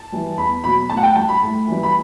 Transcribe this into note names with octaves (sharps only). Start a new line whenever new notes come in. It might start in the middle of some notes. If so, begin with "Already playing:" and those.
Already playing: A5
E3 G3
E2 B5
B2 F#3 B5
A2 A5
F#5
G5
G3 A5
B5
A2
E3 G3
B5